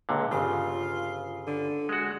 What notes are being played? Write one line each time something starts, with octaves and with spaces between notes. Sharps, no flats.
C#2 A#2 D3
G1 C#3 F4
D3
G#3 F#4